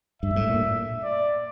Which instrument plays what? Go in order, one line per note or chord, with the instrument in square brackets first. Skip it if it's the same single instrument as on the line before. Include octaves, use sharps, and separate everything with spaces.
[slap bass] G2 [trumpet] E5
[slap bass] A2
A#2
[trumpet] D5